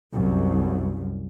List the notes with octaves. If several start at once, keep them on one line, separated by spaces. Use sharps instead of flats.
C2 F#2